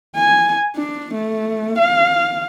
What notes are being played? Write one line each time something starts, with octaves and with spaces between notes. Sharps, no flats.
G#5
D4
A3
F5